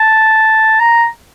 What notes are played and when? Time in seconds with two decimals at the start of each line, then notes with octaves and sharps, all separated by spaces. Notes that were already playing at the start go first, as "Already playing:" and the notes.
Already playing: A5
0.79 A#5